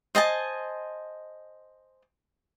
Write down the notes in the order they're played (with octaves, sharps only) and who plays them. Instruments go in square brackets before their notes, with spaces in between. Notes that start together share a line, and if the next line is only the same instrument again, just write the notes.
[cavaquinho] C5 D#5 G#5 A5